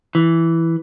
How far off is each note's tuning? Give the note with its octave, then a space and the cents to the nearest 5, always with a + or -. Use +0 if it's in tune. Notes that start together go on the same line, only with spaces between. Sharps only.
E3 +0